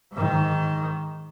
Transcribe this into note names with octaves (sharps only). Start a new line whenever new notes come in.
G#2 D#3